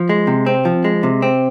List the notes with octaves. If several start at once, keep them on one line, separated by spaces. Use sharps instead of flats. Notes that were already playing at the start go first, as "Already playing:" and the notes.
Already playing: F3
G#3
C3
C4
F3
G#3
C3
C4